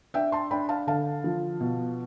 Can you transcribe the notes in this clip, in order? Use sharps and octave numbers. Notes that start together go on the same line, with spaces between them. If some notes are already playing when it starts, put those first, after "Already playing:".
D4 E5 G5
A5 C6
D4 G5 B5
F5 A5
D3 F5 A5
F3
B2